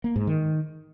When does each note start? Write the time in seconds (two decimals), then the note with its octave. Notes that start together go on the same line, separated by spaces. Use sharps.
0.04 A#3
0.16 G#2
0.27 D#3